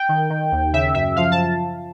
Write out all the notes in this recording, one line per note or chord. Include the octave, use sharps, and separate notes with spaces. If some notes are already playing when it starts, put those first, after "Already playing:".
Already playing: G5
D#3
D#3
D#2
C#3 E5
F#2 E5
F3 F5
A5